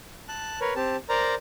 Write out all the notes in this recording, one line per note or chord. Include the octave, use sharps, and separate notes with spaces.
A5 F#6
A#4 B4 C#5
C4 G4 A5
A#4 C5 D5 A#5